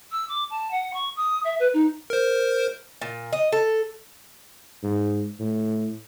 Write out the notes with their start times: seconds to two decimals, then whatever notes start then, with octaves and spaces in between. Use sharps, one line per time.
0.11 E6
0.28 D6
0.49 A5
0.71 F#5
0.93 C#6
1.16 D#6
1.44 E5
1.59 B4
1.73 D#4
2.10 A#4 C5
3.01 A#2
3.33 D#5
3.52 A4
4.83 G#2
5.39 A2